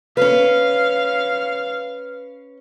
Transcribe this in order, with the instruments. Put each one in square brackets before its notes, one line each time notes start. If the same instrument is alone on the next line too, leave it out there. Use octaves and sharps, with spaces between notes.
[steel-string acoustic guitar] C#4 B4 [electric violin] F5